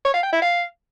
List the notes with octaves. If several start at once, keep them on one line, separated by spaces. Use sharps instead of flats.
C#5
F5
G5
E4
F5